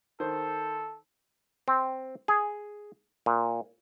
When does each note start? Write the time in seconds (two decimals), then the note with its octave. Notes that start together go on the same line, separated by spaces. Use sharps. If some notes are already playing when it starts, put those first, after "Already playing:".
0.20 D#3 A4 C5
1.68 C4
2.28 G#4
3.26 A#2